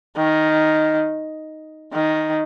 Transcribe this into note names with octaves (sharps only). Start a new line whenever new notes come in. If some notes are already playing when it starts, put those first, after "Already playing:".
D#3
D#3